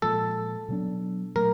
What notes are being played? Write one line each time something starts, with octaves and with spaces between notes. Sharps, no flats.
A#2 F3 G#3 A4
B2 F#3 B3 D4
A#2 F#3 A3 A#4